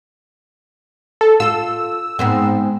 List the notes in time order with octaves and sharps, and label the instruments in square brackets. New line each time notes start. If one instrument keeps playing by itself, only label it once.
[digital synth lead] A4
[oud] F4 A4 [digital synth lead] E6
[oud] G#2 B3 C4